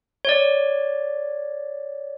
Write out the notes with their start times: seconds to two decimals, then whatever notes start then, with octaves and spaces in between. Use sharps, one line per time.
0.25 C#5 D5